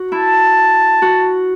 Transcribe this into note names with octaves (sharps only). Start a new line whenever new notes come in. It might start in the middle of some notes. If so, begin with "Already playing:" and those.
Already playing: F#4
E4 A5
F#4